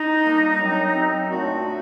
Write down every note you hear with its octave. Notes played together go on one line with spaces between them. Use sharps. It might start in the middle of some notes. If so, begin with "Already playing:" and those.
Already playing: D#4
A#2 G3 A#3 D4
F#2 F#3 C4
F#2 F#3 C4
A#2 F#3 A3 D4 F#4
A3